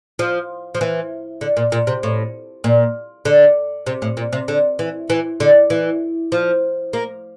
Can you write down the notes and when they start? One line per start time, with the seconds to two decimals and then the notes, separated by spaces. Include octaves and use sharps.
0.19 F3
0.75 F3
0.81 E3
1.41 D3
1.57 A#2
1.72 A#2
1.87 C3
2.03 A2
2.64 A#2
3.25 D3
3.87 C3
4.02 A2
4.17 A#2
4.33 C3
4.48 D3
4.79 E3
5.10 E3
5.40 D3
5.70 E3
6.32 F3
6.93 A#3